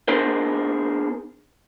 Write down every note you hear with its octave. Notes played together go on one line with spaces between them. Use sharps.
B3 D4 D#4 G#4 A#4 C5